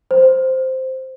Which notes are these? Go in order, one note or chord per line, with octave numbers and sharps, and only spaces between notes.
C5